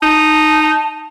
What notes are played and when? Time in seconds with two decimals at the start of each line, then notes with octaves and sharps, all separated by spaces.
0.02 D#4 A5